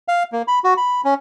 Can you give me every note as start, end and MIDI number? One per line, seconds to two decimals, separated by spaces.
0.08 0.23 77
0.32 0.42 58
0.48 0.59 83
0.64 0.74 66
0.77 1.01 83
1.05 1.14 61